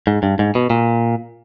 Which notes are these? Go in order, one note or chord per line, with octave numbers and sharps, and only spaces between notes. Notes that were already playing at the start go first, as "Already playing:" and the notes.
G#2
G2
G#2
B2
A#2